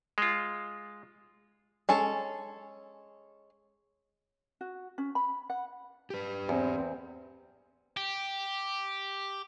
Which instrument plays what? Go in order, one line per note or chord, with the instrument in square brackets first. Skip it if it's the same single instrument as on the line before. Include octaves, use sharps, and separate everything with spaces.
[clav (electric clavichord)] G#3 F4
[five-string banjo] G#3 C#4 A4
[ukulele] F#4
C#4
B5
F#5
[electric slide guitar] G4 B4
[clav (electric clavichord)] E2 [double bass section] C4
[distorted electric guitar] G4